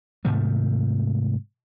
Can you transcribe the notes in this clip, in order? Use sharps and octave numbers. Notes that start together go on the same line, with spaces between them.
G#2 C3 D#3 A3